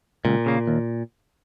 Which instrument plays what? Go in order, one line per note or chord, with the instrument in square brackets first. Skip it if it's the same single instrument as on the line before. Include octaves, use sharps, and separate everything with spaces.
[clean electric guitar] C#2 [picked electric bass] A#2
[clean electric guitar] C#3 A#3
D#2